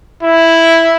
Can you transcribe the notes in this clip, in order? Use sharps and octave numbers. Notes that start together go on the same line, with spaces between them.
E4